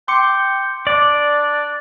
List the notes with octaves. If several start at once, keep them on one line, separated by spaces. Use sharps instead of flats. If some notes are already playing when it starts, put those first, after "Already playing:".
G5 C6 D6 C#7
D4 D5